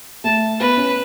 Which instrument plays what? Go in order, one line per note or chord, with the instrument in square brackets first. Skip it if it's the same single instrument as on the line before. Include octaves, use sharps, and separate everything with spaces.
[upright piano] A3 [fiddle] A5
[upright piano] B3 [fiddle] B4
[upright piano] C#4